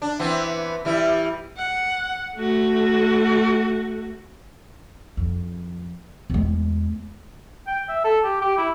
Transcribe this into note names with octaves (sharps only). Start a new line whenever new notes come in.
D4
E3 B3 C4
E3 G3 E4
F#5
A3 F#4
F2
E2 G#3
G5
E5
A4
G4
G4
E4